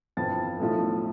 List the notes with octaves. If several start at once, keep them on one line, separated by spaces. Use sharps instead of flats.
G1 F2 E3 A5 A6
B1 A2 F3 A3